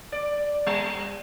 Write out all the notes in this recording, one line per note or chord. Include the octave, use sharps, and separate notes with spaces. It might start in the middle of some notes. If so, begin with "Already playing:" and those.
D5
G3